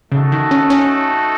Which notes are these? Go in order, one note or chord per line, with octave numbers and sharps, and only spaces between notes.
C#3 A3 D#4 F#4 A4
D#3
C#4
C#4